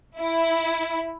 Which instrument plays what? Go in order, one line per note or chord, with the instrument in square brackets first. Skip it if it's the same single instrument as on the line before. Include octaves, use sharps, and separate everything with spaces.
[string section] E4